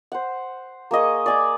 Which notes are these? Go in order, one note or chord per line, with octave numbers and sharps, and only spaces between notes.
C5 F#5
A#3 G#4 D#5 C#6
D5 G#5 D6